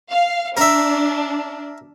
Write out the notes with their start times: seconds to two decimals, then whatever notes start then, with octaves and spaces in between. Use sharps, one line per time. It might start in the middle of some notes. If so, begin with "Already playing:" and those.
0.10 F5
0.57 D4 A#4 E5